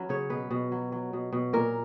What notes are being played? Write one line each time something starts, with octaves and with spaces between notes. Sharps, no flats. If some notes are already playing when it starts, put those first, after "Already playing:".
Already playing: F#3 C#4 B4
C#3 C#5
B2 B4
B2
F#3
F#3
B2
B2
A#2 A#4